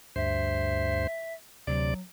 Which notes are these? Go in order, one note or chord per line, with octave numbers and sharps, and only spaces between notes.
D2 G2 C5 E5
D2 C3 F#3 D5